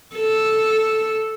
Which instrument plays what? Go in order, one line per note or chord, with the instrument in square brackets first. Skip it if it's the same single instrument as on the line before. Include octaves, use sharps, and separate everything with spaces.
[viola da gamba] A4